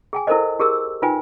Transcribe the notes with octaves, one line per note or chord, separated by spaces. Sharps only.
G#4 G5 G#5
E4 A4 A#4 C5 D#5
G4 G#4 A#4 E6
D#4 F4 B4 G5 G#5